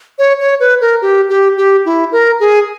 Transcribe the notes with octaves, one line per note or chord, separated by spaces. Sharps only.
C#5
C#5
B4
A#4
G4
G4
G4
E4
A#4
G#4